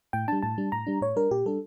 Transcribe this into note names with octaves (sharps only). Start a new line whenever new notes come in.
A2 G5
G3 D4 A5
A2 A5
G3 D4
A2 A#5
G3 D4
A2 C#5
G3 D4 A#4
A#2 G4
G3 D4 A4